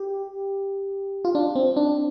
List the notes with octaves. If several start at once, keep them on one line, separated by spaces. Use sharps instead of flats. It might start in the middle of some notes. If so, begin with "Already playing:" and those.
Already playing: G4
F4
D4
C4
D4